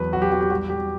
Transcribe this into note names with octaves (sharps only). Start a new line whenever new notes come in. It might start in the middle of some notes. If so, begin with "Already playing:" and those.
Already playing: E2 F#3 B4
F#3 F#4
G4
E2 F#4
G4
G3 F#4
G3 G4